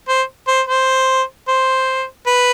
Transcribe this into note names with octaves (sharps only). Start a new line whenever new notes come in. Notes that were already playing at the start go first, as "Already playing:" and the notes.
C5
C5
C5
C5
B4